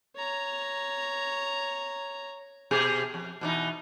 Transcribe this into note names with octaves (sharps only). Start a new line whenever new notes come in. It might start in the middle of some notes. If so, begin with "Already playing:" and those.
C#5 A#5
B2 G4 G#4
F2
B2 E3 D#4